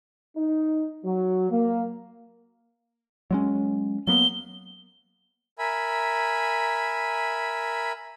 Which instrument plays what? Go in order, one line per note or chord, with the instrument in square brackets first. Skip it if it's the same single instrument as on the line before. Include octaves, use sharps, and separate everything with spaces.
[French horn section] D#4
F#3
A#3
[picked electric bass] F#3 G#3 C#4
[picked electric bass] F#3 A#3 B3 [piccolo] G7
[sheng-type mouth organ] A#4 E5 G#5 B5